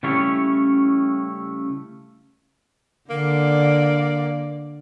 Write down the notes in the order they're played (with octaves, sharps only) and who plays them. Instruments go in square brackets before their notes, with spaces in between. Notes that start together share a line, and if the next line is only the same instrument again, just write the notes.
[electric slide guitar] C#3 G3 A3 C#4 E4 C#5
[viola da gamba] D3 D5 [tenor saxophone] A#3